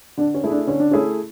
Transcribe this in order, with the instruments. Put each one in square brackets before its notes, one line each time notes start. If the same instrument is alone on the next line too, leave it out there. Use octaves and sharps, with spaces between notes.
[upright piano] D3 [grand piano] D4
[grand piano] C#4
[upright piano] A3 E4 G#4
[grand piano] D4
[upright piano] D3 [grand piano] C#4
[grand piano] D4
[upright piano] A3 E4 G#4 [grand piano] C#4